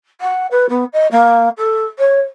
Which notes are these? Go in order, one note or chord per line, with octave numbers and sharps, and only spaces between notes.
F#5
B4
B3
D#5
A#3
A4
C#5